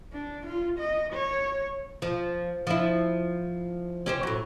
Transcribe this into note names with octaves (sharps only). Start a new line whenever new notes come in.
D4
F4
D#5
C#5
F3
F3 D4 E4
C#4 G4 C5
A2 F#3